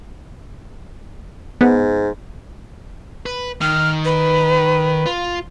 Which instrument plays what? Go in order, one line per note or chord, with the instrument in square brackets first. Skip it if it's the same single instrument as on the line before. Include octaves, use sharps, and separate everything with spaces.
[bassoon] G#2 [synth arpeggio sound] B3
[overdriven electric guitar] B4
[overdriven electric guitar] D#3 [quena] F6
[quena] B4
[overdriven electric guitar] F4